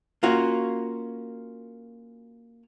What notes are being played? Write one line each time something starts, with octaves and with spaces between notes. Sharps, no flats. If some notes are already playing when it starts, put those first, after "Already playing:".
A#3 C#4 F4 F#4